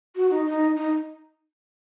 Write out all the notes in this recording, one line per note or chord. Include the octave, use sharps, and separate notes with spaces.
F#4
D#4
D#4
D#4